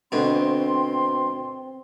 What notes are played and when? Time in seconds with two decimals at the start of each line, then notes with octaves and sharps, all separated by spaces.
0.12 D2 B2 C4 C6